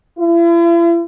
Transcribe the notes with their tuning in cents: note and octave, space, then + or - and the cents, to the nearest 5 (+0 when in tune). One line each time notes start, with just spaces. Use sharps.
E4 +45